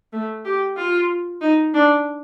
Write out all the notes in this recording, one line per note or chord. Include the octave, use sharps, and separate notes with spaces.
A3
G4
F4
D#4
D4